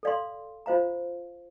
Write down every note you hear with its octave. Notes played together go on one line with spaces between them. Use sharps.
A4 D5 F5 C6
F4 C5 F5 A#5